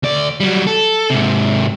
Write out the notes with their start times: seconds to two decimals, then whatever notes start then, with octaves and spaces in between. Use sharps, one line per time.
0.03 D2 D5
0.40 F#3 G3
0.67 A4
1.10 G#2 C3